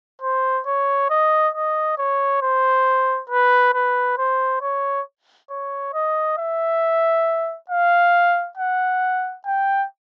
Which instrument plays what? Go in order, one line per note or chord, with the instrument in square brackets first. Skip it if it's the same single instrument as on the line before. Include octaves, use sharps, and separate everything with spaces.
[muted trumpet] C5
C#5
D#5
D#5
C#5
C5
B4
B4
C5
C#5
C#5
D#5
E5
F5
F#5
G5